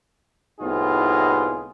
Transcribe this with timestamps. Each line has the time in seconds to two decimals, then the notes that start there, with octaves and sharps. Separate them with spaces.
0.59 C2 A2 B3 D#4 F4 G#4